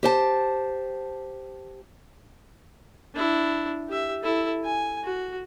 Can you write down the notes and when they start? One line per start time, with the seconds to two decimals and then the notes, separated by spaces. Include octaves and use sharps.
0.03 G4 C5 A5
3.15 D4 E4
3.89 G4 E5
4.23 E4 A4
4.65 G#5
5.04 F#4